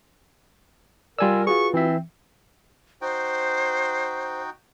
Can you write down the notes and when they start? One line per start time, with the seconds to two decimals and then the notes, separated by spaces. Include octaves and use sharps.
1.19 G3 F4 A#4 D5 G#5 E6
1.47 F4 F#4 G#4 B4 C#6
1.74 E3 C4 E5
3.01 D#4 F#4 C5 G5